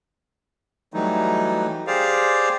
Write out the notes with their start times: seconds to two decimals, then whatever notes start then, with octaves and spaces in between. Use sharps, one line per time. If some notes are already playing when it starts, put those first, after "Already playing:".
0.94 E3 F#3 G3 A3 D#4
1.87 G4 G#4 C5 D5 F5